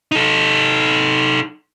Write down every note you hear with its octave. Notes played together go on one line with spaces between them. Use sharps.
D#4 A4